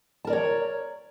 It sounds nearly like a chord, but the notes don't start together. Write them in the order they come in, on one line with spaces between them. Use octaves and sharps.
A5 A#4 D5 C#5 A#5